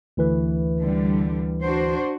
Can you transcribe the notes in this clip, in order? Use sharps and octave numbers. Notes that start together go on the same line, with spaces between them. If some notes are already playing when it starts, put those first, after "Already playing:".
D2 E3 B4
D3 G3
D4 F#4 C5